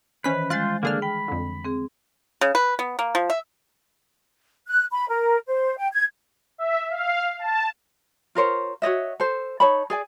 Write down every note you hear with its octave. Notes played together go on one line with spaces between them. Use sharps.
D#3 E3 C#4 B4 C5 B6
G3 G#3 F4 C5 F#6 A6 C7
D3 A#3 D4 G#4 F6
G5 B5
F2 D3
C4 G#4
C#3
B4
B3
A#3
F3
E5
F#6
B5
A#4
C5
G5
G#6
E5
F5
A5
F4 A#4 C5 C#5
F#4 C#5 D#5 E5
A4 C5
D#4 C#5 A5 B5
G#4 D5 G#5